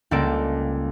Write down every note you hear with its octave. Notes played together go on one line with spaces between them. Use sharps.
C#2 G3 A#3 A4 D5 D7